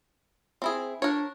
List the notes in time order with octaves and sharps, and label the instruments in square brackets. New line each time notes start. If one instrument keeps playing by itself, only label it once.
[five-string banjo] C4 E4 G#4
[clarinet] D4 [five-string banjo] A#4 C#5